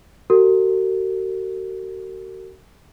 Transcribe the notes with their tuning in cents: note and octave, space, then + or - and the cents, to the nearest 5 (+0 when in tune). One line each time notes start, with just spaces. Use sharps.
F#4 +40 A#4 -45